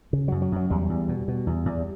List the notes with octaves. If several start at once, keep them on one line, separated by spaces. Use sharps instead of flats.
C#3
F#2 F#3
F#3
F#2 F#3
E2 G3
E2
B2
B2
E2
E2